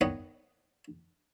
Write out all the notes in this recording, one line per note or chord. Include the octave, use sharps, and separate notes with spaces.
D#3 B3 C#5 D#5